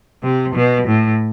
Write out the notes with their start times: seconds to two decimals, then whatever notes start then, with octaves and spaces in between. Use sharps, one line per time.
0.23 C3
0.56 B2
0.87 A2